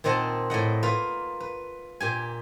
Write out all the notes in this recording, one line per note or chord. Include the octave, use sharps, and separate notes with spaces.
A#2 D#3 C4 D#5 F#5 A5
A2 D5 D#5 F#5
A#3 F4 B4
B4
A#2 G4 G#5